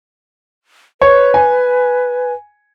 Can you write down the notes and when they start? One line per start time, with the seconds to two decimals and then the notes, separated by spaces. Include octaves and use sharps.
1.01 B4 C#5
1.34 G#5